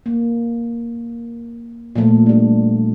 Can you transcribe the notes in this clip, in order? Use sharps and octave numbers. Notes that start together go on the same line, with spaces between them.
A#3
A#2 F3 A3
G3 D4